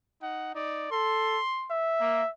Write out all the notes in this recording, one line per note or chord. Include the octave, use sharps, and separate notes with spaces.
D#4 F#5
D#4 D5
A4 C6
E5
A#3